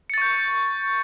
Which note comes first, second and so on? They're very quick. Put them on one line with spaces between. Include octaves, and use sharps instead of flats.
C#7 A6 C#6 G6